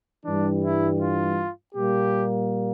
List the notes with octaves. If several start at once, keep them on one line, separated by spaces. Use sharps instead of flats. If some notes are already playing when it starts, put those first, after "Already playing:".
G2 E3 G3 D4
E4
F4
A#2 G3 A#3 G4